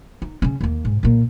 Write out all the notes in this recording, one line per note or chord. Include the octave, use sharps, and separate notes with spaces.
D#4
C#3 C#4
D#2 A#3
G#2
A#2 A#3